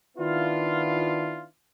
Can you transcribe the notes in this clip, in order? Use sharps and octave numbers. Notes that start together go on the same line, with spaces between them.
D#3 B3 D4 E4 F4